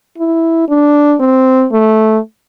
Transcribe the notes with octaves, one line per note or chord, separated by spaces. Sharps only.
E4
D4
C4
A3